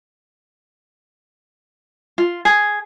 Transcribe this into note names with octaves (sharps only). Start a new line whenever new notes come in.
F4
G#4